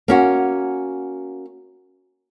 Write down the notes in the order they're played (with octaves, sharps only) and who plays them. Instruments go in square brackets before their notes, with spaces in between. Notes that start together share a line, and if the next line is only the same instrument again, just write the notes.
[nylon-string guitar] A#3 C#4 F#4